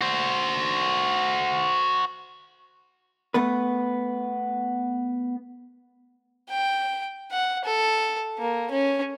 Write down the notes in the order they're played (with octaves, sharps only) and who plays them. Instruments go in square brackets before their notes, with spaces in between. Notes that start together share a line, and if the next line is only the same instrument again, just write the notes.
[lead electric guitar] F#4 C5
[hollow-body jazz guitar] A3 B3 B4
[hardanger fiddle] G5
F#5
A4
A#3
C#4